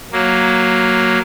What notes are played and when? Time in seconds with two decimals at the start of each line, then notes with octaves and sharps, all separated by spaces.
0.12 F#3 A#3